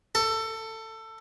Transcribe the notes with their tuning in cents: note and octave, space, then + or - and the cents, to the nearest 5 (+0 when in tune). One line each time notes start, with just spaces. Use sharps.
A4 +20